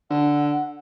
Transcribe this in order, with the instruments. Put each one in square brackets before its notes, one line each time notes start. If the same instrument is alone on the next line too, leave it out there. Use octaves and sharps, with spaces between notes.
[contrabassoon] D3 [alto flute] F#5